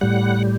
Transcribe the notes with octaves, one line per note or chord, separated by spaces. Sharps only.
A2 G3 F#5